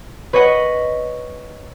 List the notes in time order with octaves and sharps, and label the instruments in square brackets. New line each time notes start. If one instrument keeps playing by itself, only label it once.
[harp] B4 C#5 D#5 F#5